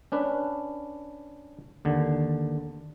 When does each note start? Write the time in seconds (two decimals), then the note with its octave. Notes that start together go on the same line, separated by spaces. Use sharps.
0.12 C#4 D4 B4
1.85 D#2 D3